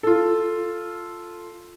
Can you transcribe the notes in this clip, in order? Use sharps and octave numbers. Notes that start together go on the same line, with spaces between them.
F4 A4